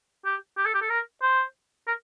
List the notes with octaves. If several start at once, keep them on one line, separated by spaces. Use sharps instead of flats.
G4
G4
A4
G4
A4
A#4
C5
A#4